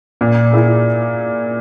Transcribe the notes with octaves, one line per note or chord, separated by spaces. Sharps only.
A#2
A#3 E4 G#4